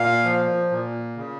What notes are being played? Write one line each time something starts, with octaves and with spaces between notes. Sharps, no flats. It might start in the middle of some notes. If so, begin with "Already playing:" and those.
Already playing: A#2 F5
F3
A#2
C#3